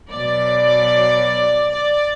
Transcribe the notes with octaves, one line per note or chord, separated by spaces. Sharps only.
B2 F#3 D5
D5